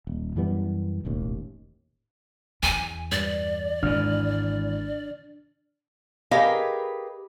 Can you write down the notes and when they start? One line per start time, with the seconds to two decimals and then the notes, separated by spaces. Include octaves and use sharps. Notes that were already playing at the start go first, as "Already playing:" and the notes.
0.07 D#1
0.36 F#2 E3 G3 B3
1.05 E1 A1 D#2
2.63 E2 G#5
3.12 G2 D5
3.83 G#1 G#2 E3 D4 F6
6.31 G4 G#4 A#4 B4 D#5 F5